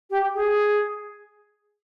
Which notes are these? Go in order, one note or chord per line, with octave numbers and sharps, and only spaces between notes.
G4
G#4